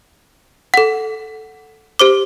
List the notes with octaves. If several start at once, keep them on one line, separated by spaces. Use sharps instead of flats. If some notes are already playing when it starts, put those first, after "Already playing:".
A4 F#5
G4 C5 D6